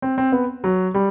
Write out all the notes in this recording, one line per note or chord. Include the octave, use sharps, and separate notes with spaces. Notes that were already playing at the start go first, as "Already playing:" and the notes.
C4
C4
B3
F#3
G3